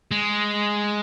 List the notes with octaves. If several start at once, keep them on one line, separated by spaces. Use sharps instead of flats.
G#3